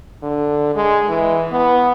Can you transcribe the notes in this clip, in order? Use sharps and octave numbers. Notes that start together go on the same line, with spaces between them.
D3
G#3
E3
B3